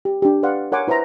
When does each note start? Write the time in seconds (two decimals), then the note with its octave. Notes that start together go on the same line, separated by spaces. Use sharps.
0.05 G4
0.22 D4 G4
0.43 B4 D5 F5 F#5 C6
0.72 A#4 C#5 F#5 G#5 C6 D6
0.88 E4 B4 C5 E5 A#5